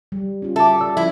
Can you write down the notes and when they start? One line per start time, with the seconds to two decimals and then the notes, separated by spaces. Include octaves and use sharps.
0.12 G3
0.42 C#4 F4
0.56 F#4 A4 E5 A5 D6
0.81 D5 E6
0.97 F3 C#4 E4